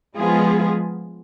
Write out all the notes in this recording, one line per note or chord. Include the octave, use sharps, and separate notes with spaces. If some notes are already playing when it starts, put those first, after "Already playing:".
F3 G#3 B3 F4 G#4